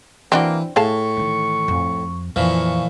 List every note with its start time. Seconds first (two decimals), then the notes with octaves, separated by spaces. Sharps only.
0.32 E3 A#3 C4 D4 F#4
0.76 A2 G#4 F5 A5 C#6
1.17 D#3 E3
1.68 F2
2.36 F2 A#2 E3 F3 C#6